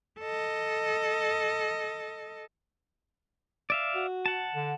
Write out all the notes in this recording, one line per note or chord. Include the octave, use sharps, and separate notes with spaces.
A4 D#5
D5 E5 F5
F#4
F#5 A5
D3